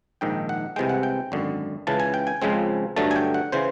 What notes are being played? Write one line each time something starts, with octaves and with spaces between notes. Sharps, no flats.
A#1 G#2 D#3 G5
F#5
C2 C3 E3 G#3 G5
F#5
G5
G#1 F#2 D3
C#2 C#3 E3 A5
G#5
G5
G#5
C#2 C#3 F3 G#3 C4
G2 D3 F#3 A3 A5
G#5
G5
F#5
C#3 E3 C5